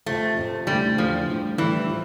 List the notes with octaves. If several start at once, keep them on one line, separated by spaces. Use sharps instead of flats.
F2 C3 F3 A3
F2 C3 F3
E2 D3 G3 A3 C4
E2 D3 F3 A3 C4
D2 D3 G3
D2 D3 E3 G3
F3